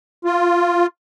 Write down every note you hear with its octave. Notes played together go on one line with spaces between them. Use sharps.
F4